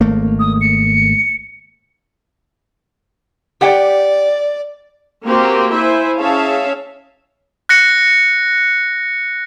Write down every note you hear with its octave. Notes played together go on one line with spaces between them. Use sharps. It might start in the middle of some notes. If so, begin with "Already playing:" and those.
G#1 A3 A#3
D#6
C#7
G4 D5 F#5 G5
A#3 C4 F#4 G4 A#4
E4 C5 E5 G#5
C#4 G#4 C#5 E5 F5 A5
F#6 A#6 C#7